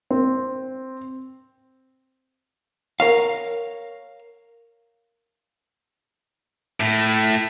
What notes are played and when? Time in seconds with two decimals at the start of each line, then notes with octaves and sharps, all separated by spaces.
0.11 C4
3.00 A#4 C#5 F5
6.80 A2